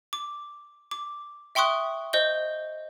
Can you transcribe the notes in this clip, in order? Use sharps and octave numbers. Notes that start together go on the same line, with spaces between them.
D6
D6
E5 G5 C6 C#6 D#6 F#6
C5 D#5 G6 G7